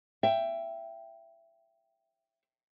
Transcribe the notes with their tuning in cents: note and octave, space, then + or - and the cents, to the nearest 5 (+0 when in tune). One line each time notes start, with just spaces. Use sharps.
E5 +20 G5 +0